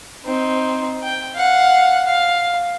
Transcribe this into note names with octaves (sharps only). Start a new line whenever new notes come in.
C4 D#4
G5
F5 F#5
F5